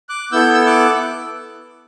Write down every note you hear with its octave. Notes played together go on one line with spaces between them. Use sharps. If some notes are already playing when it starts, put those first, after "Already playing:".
D6 F#6
B3 E4 A4 E6 G6
E6
D6 F#6